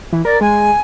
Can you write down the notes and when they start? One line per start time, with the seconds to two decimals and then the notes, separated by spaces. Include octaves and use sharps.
0.13 E3
0.25 A#4 D5
0.41 G#3 G#5